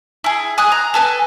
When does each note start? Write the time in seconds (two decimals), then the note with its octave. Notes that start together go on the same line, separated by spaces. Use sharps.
0.24 E4 G#4
0.58 G#5 D#6 F#6
0.72 A#5
0.94 A4 B4 G#5